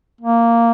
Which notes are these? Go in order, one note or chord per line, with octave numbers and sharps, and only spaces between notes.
A#3